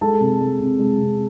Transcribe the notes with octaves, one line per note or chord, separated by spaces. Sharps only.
G#3 A4 A5
C3
G#3
C3
G#3
C3